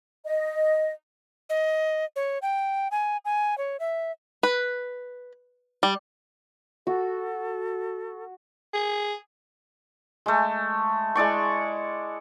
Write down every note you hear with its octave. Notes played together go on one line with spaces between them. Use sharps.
D#5
D#5
C#5
G5
G#5
G#5
C#5
E5
B4
G3
F#4 A4
G#4
G#3 A3
G#3 E4 D5 C#6